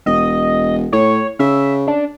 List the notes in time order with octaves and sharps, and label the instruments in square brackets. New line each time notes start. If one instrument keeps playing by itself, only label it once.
[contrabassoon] E1 [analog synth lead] D#5
[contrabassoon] A2 [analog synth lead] C#5
[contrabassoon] C#3 [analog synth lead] E5
[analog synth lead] D4